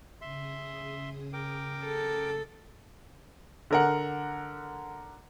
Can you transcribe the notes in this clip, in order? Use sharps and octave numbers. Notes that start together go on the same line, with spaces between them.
C#3 G#4 E5 C6 D#6
A#4 G5 D6
A4
D3 A#4 F#5